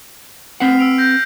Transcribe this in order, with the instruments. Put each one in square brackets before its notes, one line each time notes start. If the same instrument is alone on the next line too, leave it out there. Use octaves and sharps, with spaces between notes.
[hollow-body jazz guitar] C4 B4 F#5 [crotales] F6 B6 C7
[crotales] E6 D7 F7
G6 A#6